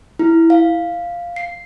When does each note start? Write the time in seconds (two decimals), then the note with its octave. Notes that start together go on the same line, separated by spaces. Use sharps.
0.19 E4
0.50 F5
1.36 C7